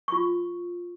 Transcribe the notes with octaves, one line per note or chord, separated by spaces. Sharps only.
F4 C#6